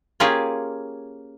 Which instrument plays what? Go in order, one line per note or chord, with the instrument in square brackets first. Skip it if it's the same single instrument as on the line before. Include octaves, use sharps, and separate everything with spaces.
[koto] A#3 C#4 F4 G4 G#4